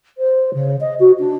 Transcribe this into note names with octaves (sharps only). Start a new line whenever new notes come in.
C5
C#3
D#5
F#4
D4